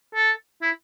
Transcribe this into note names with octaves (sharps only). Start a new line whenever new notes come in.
A4
E4